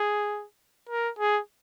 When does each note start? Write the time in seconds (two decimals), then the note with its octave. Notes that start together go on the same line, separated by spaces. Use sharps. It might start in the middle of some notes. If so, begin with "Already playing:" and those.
Already playing: G#4
0.89 A#4
1.19 G#4